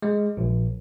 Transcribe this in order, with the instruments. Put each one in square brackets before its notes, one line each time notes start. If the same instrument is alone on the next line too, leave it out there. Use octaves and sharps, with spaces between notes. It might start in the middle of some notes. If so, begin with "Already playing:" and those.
[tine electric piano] G#3
A#1